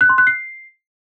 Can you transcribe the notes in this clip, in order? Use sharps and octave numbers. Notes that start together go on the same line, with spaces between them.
F#6
C6
F#6
C7